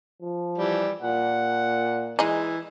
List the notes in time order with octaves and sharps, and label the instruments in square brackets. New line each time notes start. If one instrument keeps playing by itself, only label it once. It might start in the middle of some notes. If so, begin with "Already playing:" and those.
[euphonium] F3
[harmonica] E3 G3
[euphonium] A#2 [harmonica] F#5
[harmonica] E3 [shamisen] G#3 D#4